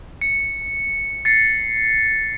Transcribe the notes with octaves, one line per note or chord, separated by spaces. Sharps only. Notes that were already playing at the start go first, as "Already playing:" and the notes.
C#7
A6 C7 C#7